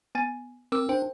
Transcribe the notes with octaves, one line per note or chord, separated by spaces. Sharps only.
B3 G#5 A6
C4 A#4 D6 E6
D4 C5 G5